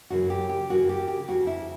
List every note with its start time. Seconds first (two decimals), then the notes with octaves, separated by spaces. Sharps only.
0.10 F#2 C#3 E3 F#4
0.30 G4
0.50 G4
0.69 F#2 C#3 E3 F#4
0.89 G4
1.08 G4
1.28 F2 C#3 E3 F#4
1.47 E4